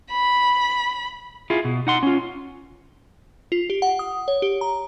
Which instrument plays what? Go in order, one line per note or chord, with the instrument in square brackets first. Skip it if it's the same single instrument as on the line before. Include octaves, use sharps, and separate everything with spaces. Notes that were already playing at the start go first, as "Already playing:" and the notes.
[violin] B5
[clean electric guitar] E4 F4 G#4
B2
D#4 F#5 C6
C#4 F4
[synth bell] F4
G4
F#5
D#6
C#5
G4
A#5